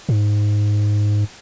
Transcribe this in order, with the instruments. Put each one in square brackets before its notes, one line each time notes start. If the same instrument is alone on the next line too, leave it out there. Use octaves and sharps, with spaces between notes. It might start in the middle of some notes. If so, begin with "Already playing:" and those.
[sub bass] G#2